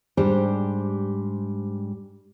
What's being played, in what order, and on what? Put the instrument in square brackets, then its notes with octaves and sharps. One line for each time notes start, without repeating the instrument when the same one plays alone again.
[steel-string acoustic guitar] G#2 G3 D4 G4 C5